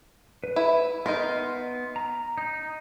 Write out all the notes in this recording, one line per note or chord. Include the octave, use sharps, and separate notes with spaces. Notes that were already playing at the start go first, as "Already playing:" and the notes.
B4
E4
B3 D#4 A#4 C6
A#5
D#4